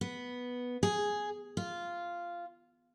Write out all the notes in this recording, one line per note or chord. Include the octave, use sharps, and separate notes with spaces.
B3
G#4
F4